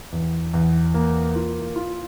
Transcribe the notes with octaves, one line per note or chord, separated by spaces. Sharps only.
E2
E2
A#3
F4
F4